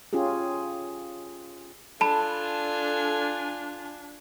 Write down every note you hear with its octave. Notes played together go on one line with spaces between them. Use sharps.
C#4 F4 G4 G#4
D4 F4 A4 G#5 A5 B5